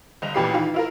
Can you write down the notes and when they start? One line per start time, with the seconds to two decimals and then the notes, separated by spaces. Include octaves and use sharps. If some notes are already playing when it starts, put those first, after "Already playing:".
0.22 G1 D#5 F7
0.34 A1 A#2 E3 G4 B5 C7
0.53 D#3 E3 F4
0.74 E4 F4 A#4